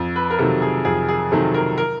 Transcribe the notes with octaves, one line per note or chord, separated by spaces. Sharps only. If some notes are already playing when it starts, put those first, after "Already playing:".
Already playing: F2
B4
A#4
C3 D#3 F#3 A4
G#4
F2 G#4
G#4
C3 D#3 F#3 A4
A#4
A#4